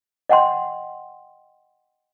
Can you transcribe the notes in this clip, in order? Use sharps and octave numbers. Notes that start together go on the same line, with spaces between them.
D#5 F#5 G5 C6